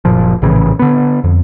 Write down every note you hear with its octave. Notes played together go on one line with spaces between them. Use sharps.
F#1 A#2 F3
A#1 A2 C#3 E3
D3 B3
F2